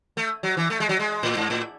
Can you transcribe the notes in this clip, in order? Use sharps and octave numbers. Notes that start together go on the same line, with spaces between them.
A3
F#3
E3
A3
G#3
F#3
G#3
A2
G#2
A2